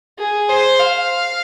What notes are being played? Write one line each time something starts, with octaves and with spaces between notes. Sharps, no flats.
G#4
C5
F5